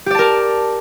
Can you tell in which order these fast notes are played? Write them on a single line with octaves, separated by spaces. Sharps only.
G4 D5 A5 A#4